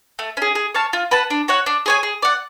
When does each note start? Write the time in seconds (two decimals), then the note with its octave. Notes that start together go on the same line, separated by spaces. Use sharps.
0.19 A3
0.37 C#4 G#4
0.55 G#4
0.74 C#5 F5 A5
0.93 F4
1.11 B4 F#5 A5
1.30 D4
1.48 F#4 C#5 F#5
1.66 D4
1.86 G#4 C#5 G#5
2.03 G#4
2.22 D5 F#5